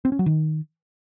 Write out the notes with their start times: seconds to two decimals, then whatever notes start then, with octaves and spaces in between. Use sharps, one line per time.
0.05 C4
0.12 C#4
0.19 F#3
0.26 D#3